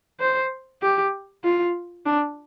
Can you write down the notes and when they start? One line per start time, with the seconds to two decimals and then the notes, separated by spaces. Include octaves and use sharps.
0.20 C5
0.82 G4
1.44 F4
2.06 D4